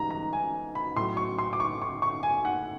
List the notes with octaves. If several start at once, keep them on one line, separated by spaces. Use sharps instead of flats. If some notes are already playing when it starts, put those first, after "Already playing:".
Already playing: G#2 E3 G3 A#5
A#5
G#5
B5
A2 F#3 C6
C#6
C6
D6
C#6
C#6
C#6
G#5
F#5